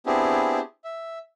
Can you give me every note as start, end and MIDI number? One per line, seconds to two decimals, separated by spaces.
0.06 0.59 59
0.06 0.59 60
0.06 0.59 62
0.06 0.59 64
0.06 0.59 67
0.06 0.59 68
0.84 1.19 76